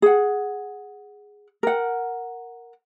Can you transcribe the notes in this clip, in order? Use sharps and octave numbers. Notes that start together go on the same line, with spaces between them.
G#4 F#5
A#4 F#5